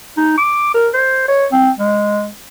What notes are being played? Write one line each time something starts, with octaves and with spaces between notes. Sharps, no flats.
D#4
D6
A#4
C5
C#5
C4
G#3